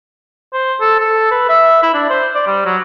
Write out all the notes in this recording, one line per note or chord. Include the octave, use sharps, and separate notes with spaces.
C5
A4
A4
B4
E5
E4
D4
C5
D5
G3
F#3